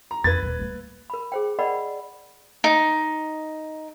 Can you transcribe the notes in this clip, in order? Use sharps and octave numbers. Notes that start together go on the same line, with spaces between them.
A#5
F2 B4 G#6 A6
D#1 B3
G3 A#3
A#4 B5
G#4 C5 G5
A#4 D5 D#5 F#5 G5 B5
D#4